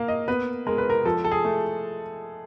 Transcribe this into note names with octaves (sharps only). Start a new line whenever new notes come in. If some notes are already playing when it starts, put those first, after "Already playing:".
Already playing: A#3 F5
D#5
B3 B4
G#3 A#4
B4
A#4
F3 A4
A4
G#4
A3